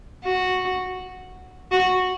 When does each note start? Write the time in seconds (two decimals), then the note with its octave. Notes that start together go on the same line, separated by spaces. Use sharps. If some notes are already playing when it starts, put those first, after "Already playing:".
0.24 F#4
1.72 F#4